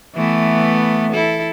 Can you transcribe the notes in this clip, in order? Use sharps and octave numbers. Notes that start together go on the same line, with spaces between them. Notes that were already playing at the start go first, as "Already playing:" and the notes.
E3 A3 B3
E4 A4